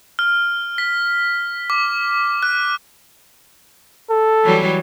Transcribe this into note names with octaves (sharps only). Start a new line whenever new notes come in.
F6
B6
D6
F#6
A4
E3 F#3 G3